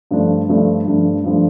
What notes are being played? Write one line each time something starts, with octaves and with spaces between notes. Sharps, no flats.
G2 F3 A3 D4
G2 F3 A3 D4
G2 F3 A3 D4
G2 F3 A3 D4